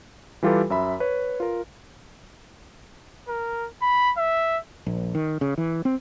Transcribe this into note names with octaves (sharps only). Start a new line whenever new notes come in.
E3 G3 F4 G4 A4 B4
F#2 E5 B5
B4 C#5
F4 A#4
A#4
B5
E5
A#1
D#3
C#3
E3
C4